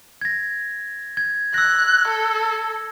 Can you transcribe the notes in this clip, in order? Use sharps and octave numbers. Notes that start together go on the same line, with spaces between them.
G#6 A#6
G#6
E6 F#6 A#6
A4